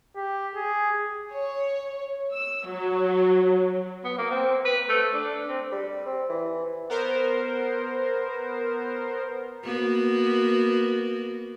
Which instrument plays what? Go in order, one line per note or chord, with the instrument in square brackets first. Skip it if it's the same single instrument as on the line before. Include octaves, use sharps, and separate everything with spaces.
[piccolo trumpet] G4
G#4
[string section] C#5
E6
F#3
[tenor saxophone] B3
A#3
C4
B4
A3
D4
C4
[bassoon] G3
C4
E3
[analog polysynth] B3 A#4 C5
[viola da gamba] A#3 B3 F#4